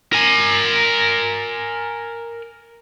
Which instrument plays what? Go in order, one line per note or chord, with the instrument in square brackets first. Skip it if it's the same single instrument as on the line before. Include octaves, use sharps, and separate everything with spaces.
[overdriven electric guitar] A#4 G#5